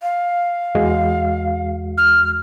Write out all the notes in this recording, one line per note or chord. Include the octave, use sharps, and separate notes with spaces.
F5
E2 G#3 F#4
F6